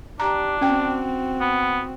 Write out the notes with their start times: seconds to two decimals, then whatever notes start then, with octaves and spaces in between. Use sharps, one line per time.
0.20 D4 G4 A#5
0.61 C4 C#4 F#4 G5
1.40 B3